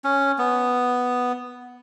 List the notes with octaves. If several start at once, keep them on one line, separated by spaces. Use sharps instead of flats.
C#4
B3